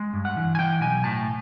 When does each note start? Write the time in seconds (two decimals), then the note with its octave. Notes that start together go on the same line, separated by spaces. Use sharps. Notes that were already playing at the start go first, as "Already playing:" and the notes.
Already playing: G#3
0.13 G2
0.25 F#5
0.36 E3
0.55 G#5
0.59 E3 G5
0.81 B1 G#5
1.04 A2 A5